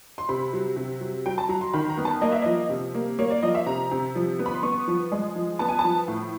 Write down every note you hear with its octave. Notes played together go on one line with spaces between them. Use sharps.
C6
C3 B5
F#3
C3
F#3
F#3 G5
A5
F#3 A#5
C6
D#3 B5
A#5
B3
A5
A#3 D#5
E5
F3 D#5
C3
A#3
A#3 C#5
D5
F3 D#5
E5
C3 A#5
C3
F3
B3
B5
C6
B3 C#6
F3
G#3
F3
B3 A5
G#5
A5
F3
A2